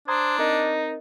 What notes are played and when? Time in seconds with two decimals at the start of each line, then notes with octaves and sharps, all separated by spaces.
0.08 D4 C5 A#5 D#6 G#6
0.38 C4 D#4 A#4 D#5